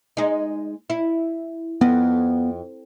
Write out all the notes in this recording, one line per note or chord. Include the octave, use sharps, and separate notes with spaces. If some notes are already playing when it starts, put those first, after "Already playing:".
G#3 D#4
E4
F2 B3